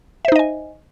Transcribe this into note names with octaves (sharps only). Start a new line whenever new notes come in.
D#4 C5 D#5 E5 G#5